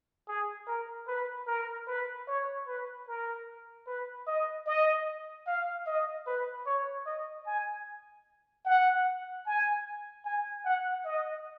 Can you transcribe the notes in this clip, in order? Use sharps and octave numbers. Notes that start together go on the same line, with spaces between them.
G#4
A#4
B4
A#4
B4
C#5
B4
A#4
B4
D#5
D#5
F5
D#5
B4
C#5
D#5
G#5
F#5
G#5
G#5
F#5
D#5